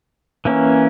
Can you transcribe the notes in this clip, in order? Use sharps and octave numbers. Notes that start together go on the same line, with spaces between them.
E3 A#3 C#4